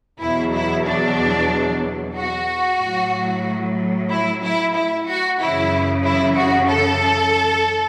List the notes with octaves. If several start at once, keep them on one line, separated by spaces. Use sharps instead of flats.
E2 B2 F#3 E4
E4
D4
F#4
A2 F#3
E4
E4
E4
F#4
F#2 C#3 E3 E4
E4
F#4
A4